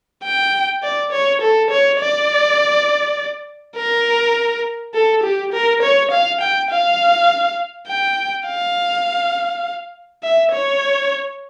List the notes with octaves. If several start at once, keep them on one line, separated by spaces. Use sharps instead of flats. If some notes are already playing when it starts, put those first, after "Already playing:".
G5
D5
C#5
A4
C#5
D5
A#4
A4
G4
A#4
C#5
F5
G5
F5
G5
F5
E5
C#5